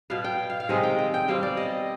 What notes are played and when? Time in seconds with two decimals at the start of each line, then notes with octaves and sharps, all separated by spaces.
0.10 B2 B3 F5
0.24 G5
0.50 F5
0.60 F5
0.69 C3 D#3 G#3 C4 D#5
0.83 G5
0.99 G5
1.14 G5
1.28 B2 G3 C4 F5
1.43 D5
1.57 D#5